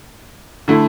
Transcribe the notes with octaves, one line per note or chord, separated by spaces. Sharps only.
D3 A3 E4